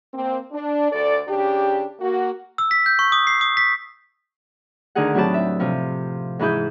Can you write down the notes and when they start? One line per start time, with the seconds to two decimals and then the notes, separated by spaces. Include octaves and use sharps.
0.14 A#3 C4
0.52 D4
0.92 D2 A4 D5
1.28 C#3 D4 G4
2.00 A#3 F#4
2.58 E6
2.71 B6
2.86 G6
2.99 C#6
3.12 D#6
3.27 C7
3.41 D#6
3.57 B6
4.95 D2 D3 D#3 D#4 G#4 F#5
5.14 A2 F#3 C4 G4 B4 A5
5.34 E5
5.59 C3 F3
6.39 G#2 E3 E4 G#4 G6